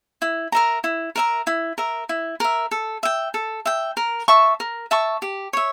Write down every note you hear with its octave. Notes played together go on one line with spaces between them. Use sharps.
E4
A#4 E5 A#5
E4
A#4 E5 A#5
E4
A#4 E5
E4
A#4 E5
A4
E5 G5
A4
E5 G5
A#4
E5 A5 C#6
A#4
E5 A5 C#6
G4
C#5 E5